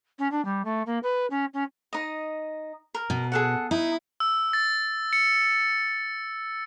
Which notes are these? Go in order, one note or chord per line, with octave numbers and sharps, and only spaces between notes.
C#4
D4
G3
A3
A#3
B4
C#4
C#4
D#4 D#5
A#4
B2
G#4 A4 F#5
D#4 E4
E6
A6
C#7